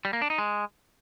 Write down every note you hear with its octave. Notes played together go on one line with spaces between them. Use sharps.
G3
A#3
D4
D#4
G#3